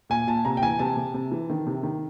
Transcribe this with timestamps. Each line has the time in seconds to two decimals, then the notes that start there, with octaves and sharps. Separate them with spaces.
0.10 A#2 G#5
0.27 A#2 A5
0.45 C3 A#5
0.57 G5
0.63 E3 G#5
0.79 C3 A5
0.97 C3
1.14 C3
1.32 E3
1.50 D#3
1.67 C3
1.83 D#3